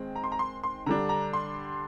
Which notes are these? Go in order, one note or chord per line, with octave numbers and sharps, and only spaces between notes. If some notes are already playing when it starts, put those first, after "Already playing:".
Already playing: D#3 G#3 C4
A#5
C6
A#5
C6
C6
D3 G3 D4 A#5
A#5
C6